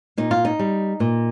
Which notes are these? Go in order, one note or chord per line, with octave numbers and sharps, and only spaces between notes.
A#2 D#4
F4
D#4
G3
A#2